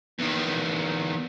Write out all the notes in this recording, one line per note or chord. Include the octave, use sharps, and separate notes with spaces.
E2 D#3